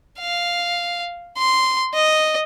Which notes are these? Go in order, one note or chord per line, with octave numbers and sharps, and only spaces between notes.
F5
C6
D#5